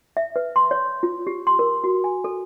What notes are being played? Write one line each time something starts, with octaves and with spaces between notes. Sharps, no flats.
E5
B4
C6
C#5
F4
G4
C6
A#4
F#4
G#5
A4